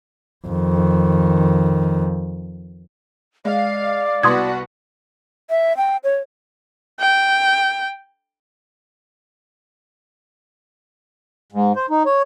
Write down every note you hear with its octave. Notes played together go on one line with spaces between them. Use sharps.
F2 D#3
G#3 D5 F5
C2 B3 F#4 B4 F#5 C6 D#6 G#6
E5
G5
C#5
G5
G#2
C5
D#4
C#5